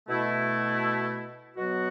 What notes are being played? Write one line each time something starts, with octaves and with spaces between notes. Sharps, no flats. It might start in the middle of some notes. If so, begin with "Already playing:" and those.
B2 A3 E4
B2 F#3 B3 F#4